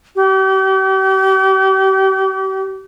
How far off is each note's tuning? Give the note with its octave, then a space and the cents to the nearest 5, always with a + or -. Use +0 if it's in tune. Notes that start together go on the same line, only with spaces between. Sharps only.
G4 -40